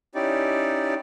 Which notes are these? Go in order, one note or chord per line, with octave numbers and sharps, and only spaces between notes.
C#4 D#4 E4 G4 D5